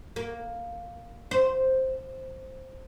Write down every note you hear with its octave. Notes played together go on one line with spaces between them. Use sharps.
A#3
C5